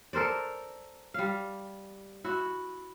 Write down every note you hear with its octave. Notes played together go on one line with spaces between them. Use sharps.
A4 A#4 C5 D5
G3 F5
E4 F#4